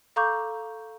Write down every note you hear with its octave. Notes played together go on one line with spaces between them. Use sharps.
A4 F5 A#5 C#6 D6 G6